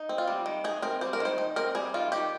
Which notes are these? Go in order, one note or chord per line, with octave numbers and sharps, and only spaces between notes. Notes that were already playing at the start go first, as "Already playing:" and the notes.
Already playing: D#4
C4
F4
G3
D#3
D#4 G#4
C4 A#4
G3 C5
A#4
D#3 C5
D#4
C4 A#4
G3 G#4
D#3 F4
D#3 G4